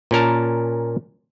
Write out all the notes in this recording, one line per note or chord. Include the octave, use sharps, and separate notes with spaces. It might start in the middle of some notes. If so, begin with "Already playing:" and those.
A#2 C#4 A#4 A5